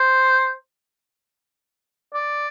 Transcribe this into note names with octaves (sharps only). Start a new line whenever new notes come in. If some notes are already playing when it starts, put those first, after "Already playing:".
Already playing: C5
D5